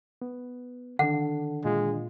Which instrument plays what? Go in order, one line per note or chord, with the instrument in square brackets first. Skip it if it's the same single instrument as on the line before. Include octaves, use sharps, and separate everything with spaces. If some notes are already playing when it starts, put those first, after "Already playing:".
[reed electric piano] B3
[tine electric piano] D3 D#3 D4 [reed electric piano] A4 [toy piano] F#5
[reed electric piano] A#2 F4 [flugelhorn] G#3